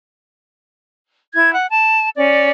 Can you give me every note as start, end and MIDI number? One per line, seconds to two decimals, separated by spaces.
1.33 1.53 64
1.33 1.53 92
1.53 1.66 78
1.70 2.07 81
2.15 2.51 61
2.15 2.51 74